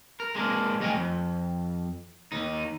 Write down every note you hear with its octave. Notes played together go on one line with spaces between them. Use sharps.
A#4
G#3 A#3 D4
F2 A3 D#5 F5 G5 G#5
F2
D#2 D#4